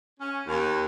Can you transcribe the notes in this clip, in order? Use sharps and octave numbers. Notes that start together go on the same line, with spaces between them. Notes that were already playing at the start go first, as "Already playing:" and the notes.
C#4
D#2